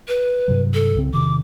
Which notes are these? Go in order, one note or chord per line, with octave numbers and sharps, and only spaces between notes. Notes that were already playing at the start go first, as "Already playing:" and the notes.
B4
G2 C3 F#3
A4
C2 C#3 C4
E2 C3 D#3 D6